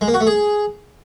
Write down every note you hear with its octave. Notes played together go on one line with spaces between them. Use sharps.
G#3
A#3
F#4
A3
G#4